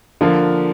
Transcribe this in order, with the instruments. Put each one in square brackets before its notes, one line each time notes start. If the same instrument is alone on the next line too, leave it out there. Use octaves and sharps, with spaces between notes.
[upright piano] D3 F3 A#3